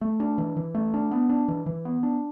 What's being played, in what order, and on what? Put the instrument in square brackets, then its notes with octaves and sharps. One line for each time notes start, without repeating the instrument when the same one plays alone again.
[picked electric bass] A3
D4
E3
E3
A3
D4
B3
D4
E3
E3
B3
D4